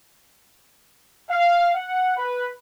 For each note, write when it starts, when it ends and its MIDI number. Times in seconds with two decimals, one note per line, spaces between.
1.30 1.70 77
1.75 2.14 78
2.17 2.48 71